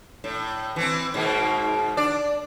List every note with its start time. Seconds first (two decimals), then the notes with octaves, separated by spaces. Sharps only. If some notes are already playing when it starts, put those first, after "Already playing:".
0.24 A2
0.76 E3 C4
1.14 G#2 B2 A#3
1.97 D4 D5